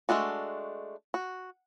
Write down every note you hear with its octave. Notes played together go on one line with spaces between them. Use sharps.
G#3 A3 D4 F#4
F#4